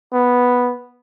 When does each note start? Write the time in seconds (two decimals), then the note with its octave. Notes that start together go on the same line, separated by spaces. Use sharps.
0.13 B3